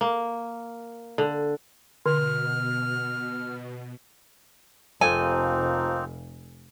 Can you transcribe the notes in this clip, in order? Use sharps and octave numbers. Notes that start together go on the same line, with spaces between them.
A#3
D3
B2 D3 F6
F1 F3 A#3 C4 D#4 A4 G#5